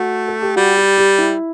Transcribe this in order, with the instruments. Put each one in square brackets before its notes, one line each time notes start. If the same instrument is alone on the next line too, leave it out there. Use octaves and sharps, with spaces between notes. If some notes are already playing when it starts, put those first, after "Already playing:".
Already playing: [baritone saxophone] A3 [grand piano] F#4
[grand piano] A4
G4
[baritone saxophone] G3 [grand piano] F#4
[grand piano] G4
G4
E4